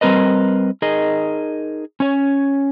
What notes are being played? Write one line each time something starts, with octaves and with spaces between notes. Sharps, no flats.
G3 C4 A#4 B4 D#5
D#4 G#4 A#4 D#5
C#4 C#5